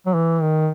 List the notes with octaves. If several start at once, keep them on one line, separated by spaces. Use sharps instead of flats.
F#3
E3
D#3